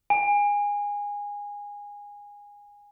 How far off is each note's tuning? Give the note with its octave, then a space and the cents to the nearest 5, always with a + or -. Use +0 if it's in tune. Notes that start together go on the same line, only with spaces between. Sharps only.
G#5 -20